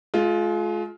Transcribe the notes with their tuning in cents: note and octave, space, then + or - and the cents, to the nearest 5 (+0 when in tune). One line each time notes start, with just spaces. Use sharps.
G#3 +40 F4 +5